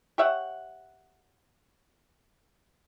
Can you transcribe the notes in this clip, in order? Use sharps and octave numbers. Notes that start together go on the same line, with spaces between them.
G4 C#5 E5 F#5